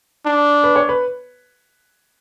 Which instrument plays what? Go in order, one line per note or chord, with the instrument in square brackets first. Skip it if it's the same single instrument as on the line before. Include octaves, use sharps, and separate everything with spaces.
[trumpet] D4
[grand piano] B4
C#5
B4